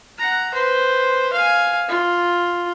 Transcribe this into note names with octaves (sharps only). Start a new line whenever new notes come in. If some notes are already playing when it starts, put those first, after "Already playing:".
F#5 A#5
B4 C5
F5 G#5
F4